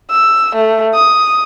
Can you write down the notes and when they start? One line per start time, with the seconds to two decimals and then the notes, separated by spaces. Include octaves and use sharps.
0.11 E6
0.56 A3
0.94 D#6